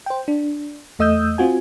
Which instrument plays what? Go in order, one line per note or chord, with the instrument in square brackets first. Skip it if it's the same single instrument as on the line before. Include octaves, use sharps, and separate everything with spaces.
[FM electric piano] C5 G5
D4
E2 A3 D#5 D#6 E6 G6
C4 F4 F#4 G#5